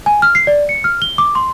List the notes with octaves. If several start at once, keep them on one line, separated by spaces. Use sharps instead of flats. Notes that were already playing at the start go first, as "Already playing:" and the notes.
G#5
F6
C7
D5
C#7
F6
G7
D6
C6